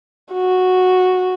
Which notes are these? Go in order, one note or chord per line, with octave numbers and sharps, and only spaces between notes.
F#4